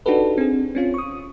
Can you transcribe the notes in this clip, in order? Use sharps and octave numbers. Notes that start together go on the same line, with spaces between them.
D4 D#4 F#4 G4 A4 B4
C4 G#4
C4 C#4 F4
C#6 D#6